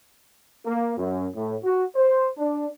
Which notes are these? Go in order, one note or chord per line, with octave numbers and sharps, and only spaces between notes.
A#3
F#2
A2
F#4
C5
D4